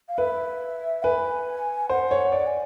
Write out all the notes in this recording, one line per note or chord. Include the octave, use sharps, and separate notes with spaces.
F5
B4 E5
B4 G#5
C5 F#5
C#5
F#5
D5
G#5